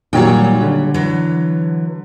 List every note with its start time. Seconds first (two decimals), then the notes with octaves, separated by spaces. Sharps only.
0.13 A#2 D#3 F#3 G3 C#5 G5
0.61 D3
0.94 E3 F#3